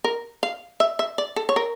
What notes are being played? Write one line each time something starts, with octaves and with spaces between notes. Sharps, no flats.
A#4
F5
E5
E5
D5
A4
C#5
A#4